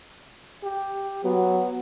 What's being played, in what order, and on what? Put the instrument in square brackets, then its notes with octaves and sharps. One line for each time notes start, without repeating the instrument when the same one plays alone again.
[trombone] G4
[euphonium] F#3 [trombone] B3